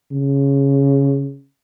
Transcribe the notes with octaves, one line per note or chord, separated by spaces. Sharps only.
C#3